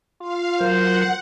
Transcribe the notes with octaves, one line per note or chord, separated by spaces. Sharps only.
F4 F5
F#3 A#4 C5 F#5